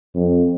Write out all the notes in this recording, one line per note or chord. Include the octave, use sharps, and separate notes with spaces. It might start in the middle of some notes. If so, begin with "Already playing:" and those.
F2